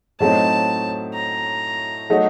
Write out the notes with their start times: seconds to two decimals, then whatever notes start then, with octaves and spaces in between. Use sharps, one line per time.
0.20 A2 F#3 A3 C4 D#4 A5
1.14 A#5
2.10 F#3 A3 D#4 F#4